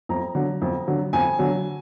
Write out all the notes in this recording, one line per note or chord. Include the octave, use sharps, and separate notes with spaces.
F2 A#5
D3 F#3
F2
D3 F#3
F2 G#5
D3 F#3